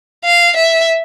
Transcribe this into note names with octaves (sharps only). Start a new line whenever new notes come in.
F5
E5